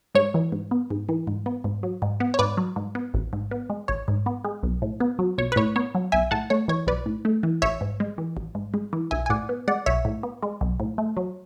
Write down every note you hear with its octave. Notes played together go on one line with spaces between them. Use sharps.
G#2 C#5
E3
G#2
B3
G#2
E3
G#2
B3
G#2
F#3
G#2
B3
C#5
G#2 B4 D5
F#3
G#2
B3
A1
G#2
B3
G#3
A1 C#5
G#2
B3
G#3
B1
A2
B3
F#3
B1 C#5
B4
A2 C#5
B3 C#5
F#3
B1 E5 G#5
A2 F#5 A5
A3 C#5
E3 C#5
B1 B4 D5
A2
A3
E3
A1 C#5 E5
G#2
G#3
E3
A1
G#2
G#3
E3
B1 E5 G#5
G#5
A2 D5 F#5
B3
G#3 D5 F#5
B1 C#5 E5
A2
B3
G#3
B1
A2
A3
F#3